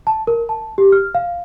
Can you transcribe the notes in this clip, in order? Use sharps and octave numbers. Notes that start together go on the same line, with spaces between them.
A5
A#4
A5
G4
F6
F5